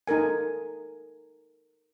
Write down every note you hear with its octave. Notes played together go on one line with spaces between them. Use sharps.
D#4 A4 A#4 G#5